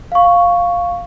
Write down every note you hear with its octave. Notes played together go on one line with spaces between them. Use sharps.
F5 C#6